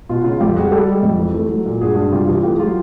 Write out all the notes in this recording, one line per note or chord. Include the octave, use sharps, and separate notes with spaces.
B2 F4
C#3 F4
F2 F4 G4
G3 F#4 G#4
G3 G4 A4
G#3
F2
E3
A3
F#3
A#2
G2 F#4 G#4
G2
C3 F4 G4
E3 F4 G4
A3 F4 G4
G#4
F#3 F4 G4